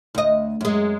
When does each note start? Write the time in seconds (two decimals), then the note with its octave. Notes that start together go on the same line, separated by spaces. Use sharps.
0.15 D2 D#5
0.61 F#2 G#3